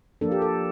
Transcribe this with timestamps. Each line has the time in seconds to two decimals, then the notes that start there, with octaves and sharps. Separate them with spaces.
0.21 F3 A#3 D4 A4
0.32 G4
0.42 A4